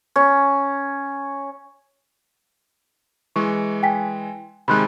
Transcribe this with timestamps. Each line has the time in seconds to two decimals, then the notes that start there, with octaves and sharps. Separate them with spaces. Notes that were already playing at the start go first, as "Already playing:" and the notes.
0.16 C#4
3.36 E3 G#3 C#6
3.83 G5 G#5 B6
4.68 C3 D#3 G#3 B5 C6 F#6